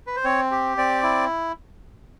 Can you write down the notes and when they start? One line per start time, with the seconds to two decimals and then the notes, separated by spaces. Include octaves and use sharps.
0.07 B4
0.16 C5
0.24 C4 C#5
0.51 G4
0.77 C4 D5
1.03 E4